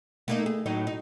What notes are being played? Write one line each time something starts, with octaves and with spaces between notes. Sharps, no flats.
A3 A#3 D#4
G#4
A2 F#3 D#4
D#4